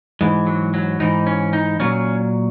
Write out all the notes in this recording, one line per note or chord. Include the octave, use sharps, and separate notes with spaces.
G#2 E3 G#3
F#3
F#3
G#2 E3 D#4
C#4
D#4
A#2 F#3 C#4